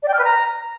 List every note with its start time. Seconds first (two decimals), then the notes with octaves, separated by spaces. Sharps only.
0.03 D5
0.08 G5
0.14 F6
0.19 B4
0.24 A#5